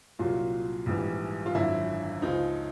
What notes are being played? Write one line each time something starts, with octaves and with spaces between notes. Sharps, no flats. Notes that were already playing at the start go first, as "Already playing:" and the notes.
C2 A#2 F#3 F4
A#1 G#2 E3 G3
F4
G#1 F#2 D3 E4
C#2 C#3 F3 D#4